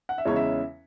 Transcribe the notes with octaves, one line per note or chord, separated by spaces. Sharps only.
F#5
E5
E2 C#3 G#3 C#4 E4 C#5
E5